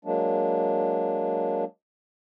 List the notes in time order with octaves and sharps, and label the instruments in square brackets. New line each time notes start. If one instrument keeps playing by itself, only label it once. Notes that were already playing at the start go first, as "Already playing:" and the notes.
[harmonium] F#3 G#3 A#3 D4